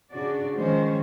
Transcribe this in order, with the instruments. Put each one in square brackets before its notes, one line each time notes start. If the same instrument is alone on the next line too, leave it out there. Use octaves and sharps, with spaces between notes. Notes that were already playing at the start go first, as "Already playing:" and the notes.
[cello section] C#3 D4 F#4 D5
D#3 F3 G#3 C#4 C5 C#5